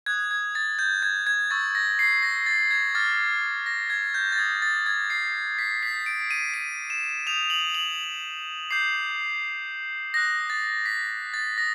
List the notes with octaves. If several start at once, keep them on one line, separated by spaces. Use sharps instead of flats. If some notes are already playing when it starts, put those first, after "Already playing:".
D#6 F#6 G#6
G#6
A6
G6
G#6
G#6
C#6 E6 G6 A6
A#6
C7
A#6
A6
G#6
D6 F6 A6
A#6
G#6
G6
A6
D#6 G6 G#6
A6
G#6
C7
B6
D#6 G6 B6
D7
D#7
D#7
E7
D#6 G6 F7
F#7
F#7
D6 G6 C7
D#6 F#6 A#6
A6
B6
A6
D#6 A#6